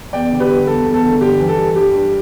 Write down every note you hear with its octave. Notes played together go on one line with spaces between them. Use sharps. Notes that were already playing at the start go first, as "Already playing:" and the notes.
E2 D5 G5
D3
G4 B4
G3
E2 A4
E2
A4
D3
G2 G4
E3
A4
G3
G2 G4
G2